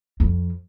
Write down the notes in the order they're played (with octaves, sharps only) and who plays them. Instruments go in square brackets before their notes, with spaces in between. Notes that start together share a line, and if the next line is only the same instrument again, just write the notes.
[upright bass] F2